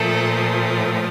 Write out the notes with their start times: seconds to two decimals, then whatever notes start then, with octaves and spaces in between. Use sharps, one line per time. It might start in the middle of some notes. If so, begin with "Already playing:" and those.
Already playing: A#2 F3 A3 A4